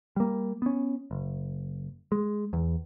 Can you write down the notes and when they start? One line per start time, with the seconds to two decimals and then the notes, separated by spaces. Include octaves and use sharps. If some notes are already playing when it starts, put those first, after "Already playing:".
0.16 G3 A#3
0.62 B3 C#4
1.11 F#1
2.12 G#3
2.53 E2